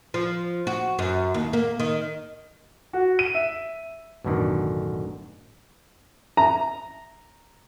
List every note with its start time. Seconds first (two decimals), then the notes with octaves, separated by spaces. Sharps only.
0.14 F3
0.67 F#4
0.99 F#2
1.34 D#2
1.53 A#3
1.80 D#3
2.93 F#4
3.19 D#7
3.35 E5
4.24 A1 F#2 B2 D3 D#3
6.37 A#5